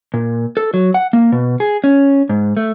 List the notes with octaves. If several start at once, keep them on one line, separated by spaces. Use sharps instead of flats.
A#2
A4
F#3
F#5
A#3
B2
G#4
C#4
G#2
A3